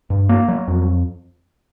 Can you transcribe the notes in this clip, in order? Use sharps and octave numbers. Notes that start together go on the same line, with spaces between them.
G2
A#3
F#3
F2